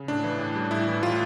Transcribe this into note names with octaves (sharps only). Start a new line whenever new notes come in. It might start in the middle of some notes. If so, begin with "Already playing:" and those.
Already playing: C#3
A2 D4
E3
A2
G3
A2 E4
E3
A2 F4